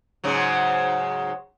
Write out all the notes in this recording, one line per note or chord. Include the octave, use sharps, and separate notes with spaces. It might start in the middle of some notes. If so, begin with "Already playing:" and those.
G#2 C#3 F#3